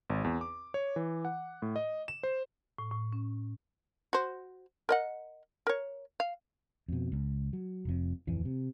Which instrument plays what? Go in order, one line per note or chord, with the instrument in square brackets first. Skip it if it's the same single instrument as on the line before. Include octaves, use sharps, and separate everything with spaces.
[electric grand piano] G#1
E2
D6
C#5
E3
F#5
A2
D#5
E7
C5
[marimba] A2
A2
C#4
[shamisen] F#4 C5
A#4 D#5 F#5
A#4 C#5
F5
[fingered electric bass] F2 B2
C#2
F#3
F1 F2
D1 F2 E3
C3